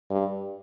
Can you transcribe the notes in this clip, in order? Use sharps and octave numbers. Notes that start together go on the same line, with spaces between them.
G2